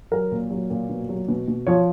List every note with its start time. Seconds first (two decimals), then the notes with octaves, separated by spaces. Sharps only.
0.11 F#3 A#4
0.32 A#2
0.50 F#3
0.70 A#2
0.90 B2
1.09 F#3
1.28 B2
1.48 B2
1.67 F3 C#5